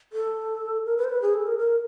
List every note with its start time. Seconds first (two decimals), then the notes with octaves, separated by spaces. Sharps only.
0.13 A4
0.86 A#4
0.97 B4
1.04 C5
1.10 B4
1.22 G#4
1.34 A4
1.47 A#4
1.59 A#4